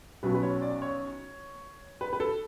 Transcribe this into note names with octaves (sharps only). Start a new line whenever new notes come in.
B1 B2 F#3 C#4 B4
B4
C#5
D5
C#5
B4
B4
A4